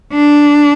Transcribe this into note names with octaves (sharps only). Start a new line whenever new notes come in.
D4